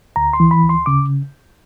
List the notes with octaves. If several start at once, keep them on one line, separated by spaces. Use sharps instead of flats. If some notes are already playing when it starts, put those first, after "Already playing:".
D2 A#5
C6
E3
B5
D2
C6
C#3 D6